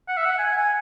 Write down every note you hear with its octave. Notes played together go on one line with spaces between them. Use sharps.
F#5
E5
F#5
G#5
G#5